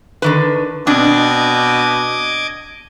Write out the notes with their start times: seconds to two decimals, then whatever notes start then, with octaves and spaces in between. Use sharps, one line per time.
0.22 D3 D#3 B4
0.87 B2 C4 D4 D#5 D6 G#6